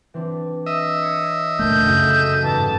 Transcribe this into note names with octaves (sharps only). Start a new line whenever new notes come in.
E3 C4 D4
D#5 E5
C#5 B5 C#7
D2 A#2 A3 A#4 A5 G6
F#2 C#3 F#4 A4 F#5
A1 G#2 A5 E6